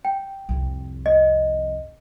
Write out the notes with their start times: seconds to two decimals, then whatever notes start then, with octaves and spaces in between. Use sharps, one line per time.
0.05 G5
0.49 C2 F2
1.06 D#5